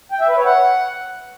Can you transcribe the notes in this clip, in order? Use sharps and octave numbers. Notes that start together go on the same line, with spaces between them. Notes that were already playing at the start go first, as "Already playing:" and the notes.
G5
E5
B4
C#5
F#5